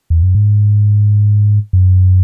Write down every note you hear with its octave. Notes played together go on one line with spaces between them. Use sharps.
E2
F#2
G#2
F#2